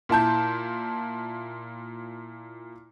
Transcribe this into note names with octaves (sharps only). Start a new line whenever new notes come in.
A#2 E4 A5 G6